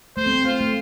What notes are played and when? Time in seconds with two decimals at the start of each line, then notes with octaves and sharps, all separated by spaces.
0.17 A3 C5
0.27 C4
0.45 C4 F4
0.60 A3